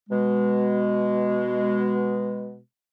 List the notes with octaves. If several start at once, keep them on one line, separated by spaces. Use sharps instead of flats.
B2 G#3